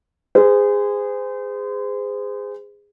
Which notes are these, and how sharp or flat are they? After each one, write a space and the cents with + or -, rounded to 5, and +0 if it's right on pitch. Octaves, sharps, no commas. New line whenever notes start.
G#4 -20 C5 -35